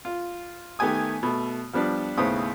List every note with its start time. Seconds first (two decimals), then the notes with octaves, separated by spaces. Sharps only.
0.05 F4
0.79 D#3 A3 B3 G4 G#5 D#6
1.23 B2 A3
1.73 F3 G3 B3 D4
2.17 D#2 A2 C#3 B3 C5 D#6